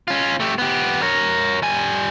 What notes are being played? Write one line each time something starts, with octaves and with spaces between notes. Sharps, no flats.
C#4 F4
A3 G4
B3 G4
A#4 C#5
G3 G#5